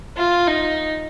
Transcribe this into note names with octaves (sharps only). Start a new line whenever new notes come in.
F4
D#4